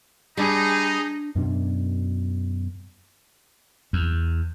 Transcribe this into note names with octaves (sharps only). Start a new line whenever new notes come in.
G3 D4 D#4 G#4 C7
F#2 B2 D4
E2